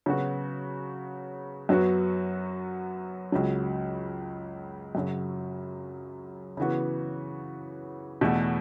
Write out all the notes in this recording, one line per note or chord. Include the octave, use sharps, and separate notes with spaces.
C#3 F#3 B3 F#4
F#2 F#3 B3 F#4
C#2 C#3 F#3
F#2 C#3 F#3
C#3 E3 B3 F#4
E2 B2 A3